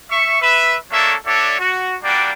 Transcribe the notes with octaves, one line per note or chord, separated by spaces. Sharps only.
E5 C#6
B4 E5
A3 A#3 D4 A4 C#5 E5
D4 F#4 A4 C#5 D5 E5
F#4
G3 A#3 D4 F#4 D5 G5